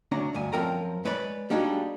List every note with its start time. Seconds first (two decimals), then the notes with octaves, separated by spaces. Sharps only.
0.12 D2 C#4 D4 A#5
0.34 D2 G2 G#5
0.53 F#2 F3 C4 A#4 G5 A#5
1.05 G#3 B4 C#5 D5 B5
1.50 G3 A#3 D4 D#4 F#4 G#4